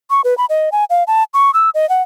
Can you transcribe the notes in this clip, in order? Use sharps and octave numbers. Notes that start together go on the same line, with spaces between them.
C#6
B4
B5
D#5
G#5
F5
A5
C#6
E6
D#5
F#5